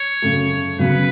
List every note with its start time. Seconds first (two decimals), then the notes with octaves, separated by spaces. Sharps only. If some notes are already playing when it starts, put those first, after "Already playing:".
Already playing: C#5
0.22 F#2 C#3 A3
0.79 C#3 F#3 B3 B4